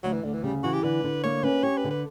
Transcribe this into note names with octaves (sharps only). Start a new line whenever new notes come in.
D2 F#3
E3
D2 D3
E3
C#3 G3
E3 F#4
G4
D3 B4
D3
A#3 C#5
C#4 B4
G4 C#5
B4
D3
B4